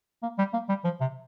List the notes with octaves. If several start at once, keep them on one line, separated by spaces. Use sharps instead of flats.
A#3
G3
A#3
G3
F3
C3